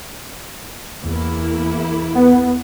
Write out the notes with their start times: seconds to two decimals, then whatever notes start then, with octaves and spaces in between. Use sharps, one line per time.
1.02 E2 A#3 E4
2.15 B3